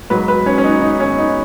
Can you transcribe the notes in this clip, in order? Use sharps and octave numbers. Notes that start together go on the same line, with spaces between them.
G#2 F#3 B4
B4
C#4
C#4
D#4
D#4
C#4
D#4